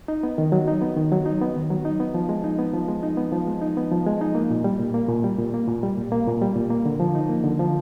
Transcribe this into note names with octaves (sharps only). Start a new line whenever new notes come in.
D#4
B3
D#3
F#3
D#4
B3
D#3
F#3
D#4
B3
D#3
F#3
D#4
B3
F3
G#3
D#4
B3
F3
G#3
D#4
B3
F3
G#3
D#4
B3
F3
G#3
D#4
A#3
A#2
G3
A#2
A#3
A#2
G3
A#2
A#3
A#2
G3
A#2
A#3
A#2
G3
A#2
A#3
D3
F3
D#4
A#3
D3
F3